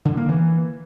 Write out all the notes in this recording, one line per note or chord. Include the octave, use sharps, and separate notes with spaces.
D3
A#3
E3